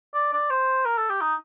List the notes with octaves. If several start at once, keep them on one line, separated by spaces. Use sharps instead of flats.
D5
D5
C5
A#4
A4
G4
D#4